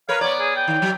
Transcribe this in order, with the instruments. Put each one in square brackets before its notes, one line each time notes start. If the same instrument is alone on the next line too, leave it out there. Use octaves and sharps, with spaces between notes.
[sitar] A#4 B4 C#5 [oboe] F5
[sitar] B3 D5 [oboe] C#5
[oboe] G#4
G5
[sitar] D#3
F#3